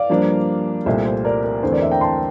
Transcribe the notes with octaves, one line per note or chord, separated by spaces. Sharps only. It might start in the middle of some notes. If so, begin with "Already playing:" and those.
Already playing: D5 F5
G2 F3 A#3 D4
C2 A#2 A3 C4 C5 E5
C5
A#4 D5
A#4
E2 D3 A3 C4 C5
A#4 D5
C5 E5
G5 A#5
A5 C6